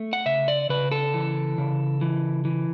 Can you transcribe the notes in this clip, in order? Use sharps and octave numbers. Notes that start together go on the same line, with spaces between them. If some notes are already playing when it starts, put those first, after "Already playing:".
Already playing: A3
F#5
C#3 E5
D5
C#3 B4
A4
E3
C#3
E3
E3